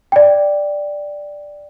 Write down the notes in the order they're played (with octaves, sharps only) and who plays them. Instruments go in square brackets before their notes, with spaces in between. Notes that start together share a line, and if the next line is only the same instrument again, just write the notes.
[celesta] D5 G5